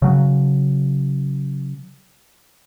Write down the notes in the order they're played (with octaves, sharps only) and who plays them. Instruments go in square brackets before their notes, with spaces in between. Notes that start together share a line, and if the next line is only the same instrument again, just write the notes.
[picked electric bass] C#3 F#3